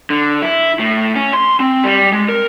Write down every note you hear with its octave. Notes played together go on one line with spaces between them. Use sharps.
D3
E4
A2
C#4
C6
C4
G3
G#3
A#4